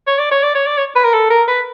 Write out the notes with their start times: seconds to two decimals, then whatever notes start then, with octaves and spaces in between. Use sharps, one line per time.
0.07 C#5
0.19 D5
0.32 C#5
0.43 D5
0.55 C#5
0.66 D5
0.78 C#5
0.96 B4
1.05 A#4
1.14 A4
1.30 A#4
1.48 B4